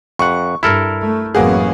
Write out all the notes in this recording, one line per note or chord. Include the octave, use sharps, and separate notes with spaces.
F2 F#5 C#6
G2 E4 A4 A#4 F6
A3
A1 F#2 A#3 B3 F#4 G#4